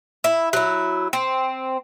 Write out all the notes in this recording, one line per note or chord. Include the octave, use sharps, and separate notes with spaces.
E4
F#3 E4
C4